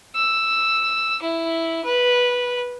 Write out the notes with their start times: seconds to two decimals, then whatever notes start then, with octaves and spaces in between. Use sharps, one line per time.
0.16 E6
1.22 E4
1.85 B4